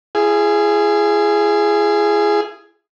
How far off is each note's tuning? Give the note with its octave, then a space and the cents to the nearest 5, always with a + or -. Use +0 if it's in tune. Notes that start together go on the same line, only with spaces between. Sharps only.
E4 +45 G#4 +0